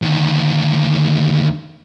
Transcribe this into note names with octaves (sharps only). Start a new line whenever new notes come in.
D2 D#3